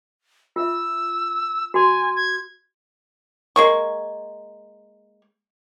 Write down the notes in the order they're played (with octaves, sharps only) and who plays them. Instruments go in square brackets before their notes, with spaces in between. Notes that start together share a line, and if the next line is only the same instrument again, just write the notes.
[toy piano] F4 E5 [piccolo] E6
[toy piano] F#4 C6 [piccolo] G#5
[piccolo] G#6
[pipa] G#3 A#3 C#6